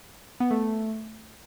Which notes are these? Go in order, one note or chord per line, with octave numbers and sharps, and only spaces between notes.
B3
A3